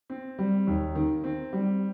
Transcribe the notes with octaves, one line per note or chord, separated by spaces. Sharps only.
C4
G3
D#2
D#3
C4
G3